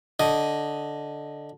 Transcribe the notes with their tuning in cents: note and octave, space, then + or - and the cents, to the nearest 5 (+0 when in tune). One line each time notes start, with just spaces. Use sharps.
D3 -5 D#5 +0